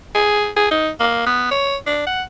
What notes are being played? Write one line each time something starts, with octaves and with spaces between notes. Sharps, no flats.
G#4
G#4
D#4
A#3
B3
C#5
D4
F#5